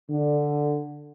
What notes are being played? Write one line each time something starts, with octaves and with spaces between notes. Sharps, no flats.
D3